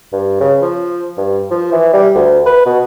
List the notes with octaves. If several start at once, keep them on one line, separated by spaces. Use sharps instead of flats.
G2
C#3
F3
G2
F3
E3
G3
D2
B4
B2